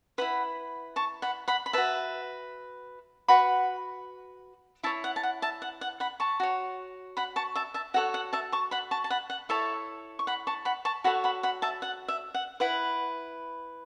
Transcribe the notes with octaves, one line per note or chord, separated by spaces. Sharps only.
E4 B4 F#5 B5
A5 C#6
F#5 B5
F#5 B5
B5
F#4 B4 E5 A5
F#4 B4 F#5 B5
E4 C#5 E5 A5
F#5
A5
F#5
E5 A5
F#5
F#5
F#5 B5
A5 C#6
F#4 C#5
F#5 B5
A5 C#6
E5 A5
E5 A5
F#4 A4 C#5 F#5
F#5
E5 A5
A5 C#6
F#5 B5
A5 C#6
A5
F#5 B5
F#5
E4 A4 C#5 E5 A5
C#6
F#5 B5
A5 C#6
F#5 B5
A5 C#6
F#4 A4 C#5 F#5 B5
F#5 B5
F#5 B5
E5 A5
F#5
E5
F#5
E4 B4 F#5